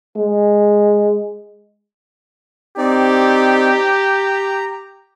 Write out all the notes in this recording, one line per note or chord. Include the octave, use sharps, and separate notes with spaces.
G#3
C4 D#4 G4 D5
A#5